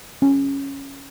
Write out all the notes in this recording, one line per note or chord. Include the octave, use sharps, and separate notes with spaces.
C#4